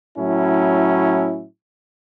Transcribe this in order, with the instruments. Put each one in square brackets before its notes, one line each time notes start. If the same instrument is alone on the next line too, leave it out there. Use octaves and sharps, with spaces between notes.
[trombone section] A2 F#3 C#4 E4